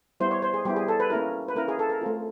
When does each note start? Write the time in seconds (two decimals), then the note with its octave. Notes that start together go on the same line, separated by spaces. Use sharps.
0.20 G3 B3 E4 C5
0.31 C#5
0.42 C5
0.54 G#4
0.65 G3 B3 E4 G4
0.76 G#4
0.88 A4
1.00 B4
1.10 A#3 C#4 E4 A#4
1.48 B4
1.56 A#3 C#4 E4 A#4
1.68 G#4
1.79 A4
1.90 A#4
2.01 A3 C4 F4